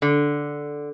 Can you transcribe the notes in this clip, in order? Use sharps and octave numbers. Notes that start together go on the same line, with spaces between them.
D3